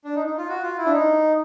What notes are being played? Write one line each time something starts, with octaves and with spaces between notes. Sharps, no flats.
D4
D#4
D#4
F4
F#4
F4
E4
D4
D#4